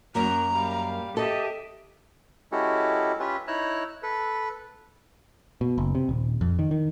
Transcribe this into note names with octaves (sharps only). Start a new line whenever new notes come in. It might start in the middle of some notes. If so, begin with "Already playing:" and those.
F#2 F#3 A#3 A#5
G3 F5
G4 A4 D#5 E5
G#3 C#4 E4 F#4 G4 A4
C#4 F4 G4 B4 E5
D#4 E4 C#5 A#5 E6 F#6
A4 B4
B2
F#1
C3
D#1
F2
D#3
D#3